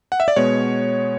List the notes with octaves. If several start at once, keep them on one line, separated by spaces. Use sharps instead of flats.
F#5
E5
D5
B2 G#3 B3 C#5